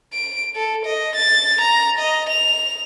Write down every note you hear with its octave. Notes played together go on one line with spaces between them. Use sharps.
D7
A4
D#5
A6
A#5
D#5
F7